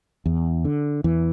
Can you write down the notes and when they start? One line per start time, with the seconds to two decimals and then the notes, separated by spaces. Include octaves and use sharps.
0.26 E2
0.65 D3
1.04 E2 E3